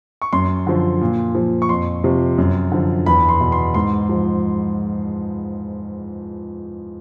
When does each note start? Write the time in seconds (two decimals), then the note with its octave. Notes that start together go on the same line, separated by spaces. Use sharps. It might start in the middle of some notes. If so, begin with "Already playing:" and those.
0.22 C#6
0.33 F#2 C6
0.67 D3 F3
1.01 A#2
1.35 F3
1.62 C#6
1.69 F2 C6
2.04 C3 F3
2.38 F#2
2.72 D3 F3
3.06 E2 B5
3.29 C6
3.41 B2
3.52 C6
3.74 G#2 C6
4.09 F3